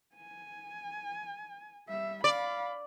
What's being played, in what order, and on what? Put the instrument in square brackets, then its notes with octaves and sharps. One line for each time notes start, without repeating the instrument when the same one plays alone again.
[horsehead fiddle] G#5
G3 E5
[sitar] D5 [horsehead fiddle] F5 B5